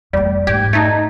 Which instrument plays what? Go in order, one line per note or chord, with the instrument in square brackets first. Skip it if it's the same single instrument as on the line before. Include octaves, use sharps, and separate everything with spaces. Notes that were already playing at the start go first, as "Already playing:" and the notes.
[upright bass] F2 A3 [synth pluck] G3 [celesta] D5
[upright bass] G#2 [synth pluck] G4 [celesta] G#6
[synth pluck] A3 D#4 [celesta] G#6